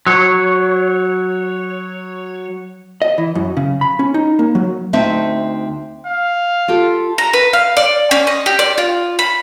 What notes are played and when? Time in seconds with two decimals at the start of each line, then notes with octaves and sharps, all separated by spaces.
0.07 F#3 C#5
3.02 D#5
3.18 E3
3.35 F#2
3.57 C#3
3.81 B5
3.99 C#4
4.14 D#4
4.39 A#3
4.55 F#3
4.93 D2 C4 D#4 E5
6.07 F5
6.68 F4 G4 A4
7.18 A#5
7.33 B4
7.53 F5
7.77 D5
8.11 C#4
8.27 D#5
8.46 G4
8.59 D5
8.78 F4
9.19 B5